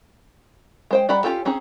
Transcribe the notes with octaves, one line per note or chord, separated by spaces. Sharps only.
G#3 C5 G5
G3 D5 F#5 A#5 B5
C#4 F4 G4 A4
C4 C#4 D#4 G#4